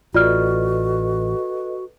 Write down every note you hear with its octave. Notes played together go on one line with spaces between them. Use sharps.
A1 F4 F#4 A4 B4 D5 D#5 F6